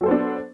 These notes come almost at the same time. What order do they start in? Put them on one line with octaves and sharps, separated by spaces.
F#3 A4 C5 B3 D4